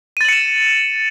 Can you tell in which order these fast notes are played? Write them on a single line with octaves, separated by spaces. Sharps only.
D#7 A6 F#7 C#7 E7